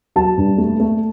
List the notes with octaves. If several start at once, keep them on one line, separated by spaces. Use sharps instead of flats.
F#3 A5
G2
A3
A3